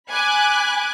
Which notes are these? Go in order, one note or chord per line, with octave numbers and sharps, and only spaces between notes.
G#5 B5 D6 F#6